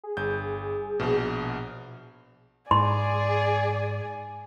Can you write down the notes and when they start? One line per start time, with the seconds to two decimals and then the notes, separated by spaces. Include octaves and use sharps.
0.03 G#4
0.17 G1 G6
1.00 A#1 B2
2.71 G#2 G#4 D5 G#5 C6